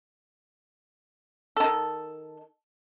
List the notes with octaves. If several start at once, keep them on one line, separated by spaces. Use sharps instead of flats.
D#3 A4